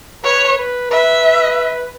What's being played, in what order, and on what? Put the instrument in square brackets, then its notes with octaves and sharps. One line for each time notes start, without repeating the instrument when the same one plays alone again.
[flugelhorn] B4 [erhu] C#5
[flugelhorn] B4
[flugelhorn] B4 [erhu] E5